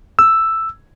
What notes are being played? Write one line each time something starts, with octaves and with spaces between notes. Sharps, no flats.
E6